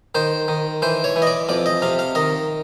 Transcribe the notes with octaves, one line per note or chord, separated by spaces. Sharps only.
D#3 C5
D#3
E3 C5
C#5
E3
D#5
D5
F2 D5
D#5
C3 F5
F5
D#3 D#5